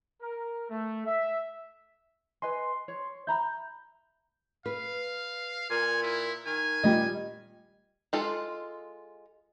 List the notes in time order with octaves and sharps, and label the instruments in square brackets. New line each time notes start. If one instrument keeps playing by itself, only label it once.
[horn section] A#4
A3
E5
[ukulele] B4 D#5 G#5 [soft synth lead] C6
[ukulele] C#5
[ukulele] E5 A#5 B5 [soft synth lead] G6
[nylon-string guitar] B4 [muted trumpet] F5
[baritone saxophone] A#2 [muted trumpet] G#5
[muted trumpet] E4
[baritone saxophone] D#3 [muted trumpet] G#5
[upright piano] A#2 G3 [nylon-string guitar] D#5
[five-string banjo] G#3 F4 A4